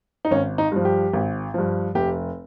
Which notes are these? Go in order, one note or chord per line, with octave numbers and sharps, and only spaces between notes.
D#4
G#1 C#4
D#4
G2 F3
G4
G#1
G2 F3
F1 G4